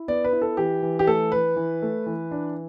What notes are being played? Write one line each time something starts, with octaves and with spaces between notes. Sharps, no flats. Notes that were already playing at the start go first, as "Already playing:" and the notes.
Already playing: E4
B3 D5
B4
E4
A4
E3 G4
E3
G4
A3 A4
E3 B4
E3
A3
E3
D4